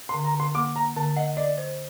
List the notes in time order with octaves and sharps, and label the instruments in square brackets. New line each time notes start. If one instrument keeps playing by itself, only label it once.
[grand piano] C6
[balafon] D3
[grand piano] A#5
[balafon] D3 [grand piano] C6
[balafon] A#3 [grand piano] D6
[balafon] A#3 [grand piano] A#5
[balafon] D3 [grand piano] A5
[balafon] D#5 [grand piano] F#5
[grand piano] D5 [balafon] D#5
[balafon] C5